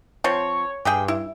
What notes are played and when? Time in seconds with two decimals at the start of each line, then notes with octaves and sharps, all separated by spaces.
0.24 F3 C4 C#5
0.85 G2 G4 G#4 G5
1.08 E4